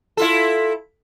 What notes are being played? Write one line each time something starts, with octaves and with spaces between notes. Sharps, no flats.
E4 F4 A4